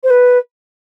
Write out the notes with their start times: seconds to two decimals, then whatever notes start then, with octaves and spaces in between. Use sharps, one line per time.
0.03 C5
0.10 B4